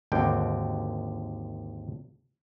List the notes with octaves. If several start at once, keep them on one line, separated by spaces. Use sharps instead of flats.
G#1 D#2 D3 G5